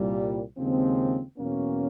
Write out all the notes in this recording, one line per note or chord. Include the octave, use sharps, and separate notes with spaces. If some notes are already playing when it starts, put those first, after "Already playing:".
Already playing: C2 A#2 G3
D#2 C#3 F3 G#3 C4
E2 B2 F#3 A#3 C#4